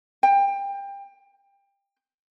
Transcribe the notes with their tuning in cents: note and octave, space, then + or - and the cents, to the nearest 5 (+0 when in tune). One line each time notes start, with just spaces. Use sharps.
G5 +25